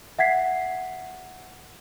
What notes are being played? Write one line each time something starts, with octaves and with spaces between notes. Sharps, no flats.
E5 F#5 G#6 B6 C7